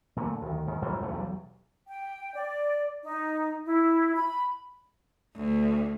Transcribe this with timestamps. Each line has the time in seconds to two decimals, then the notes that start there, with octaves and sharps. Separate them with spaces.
0.16 A#2 D3 E3 A3
0.42 D2 D#3
0.67 G#2 D#3
0.82 A1 F2 G#2 G3
1.02 B1 E2 C#3 A3
1.13 B1 E2 F#3 G3
1.87 G5
2.35 D5
3.03 D#4
3.65 E4
4.15 B5
5.36 D2